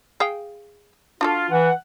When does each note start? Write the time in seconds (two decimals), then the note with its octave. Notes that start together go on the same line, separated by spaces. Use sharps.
0.20 G#4 F5 G5
1.21 D4 F4 F#4 A4
1.51 E3 F#5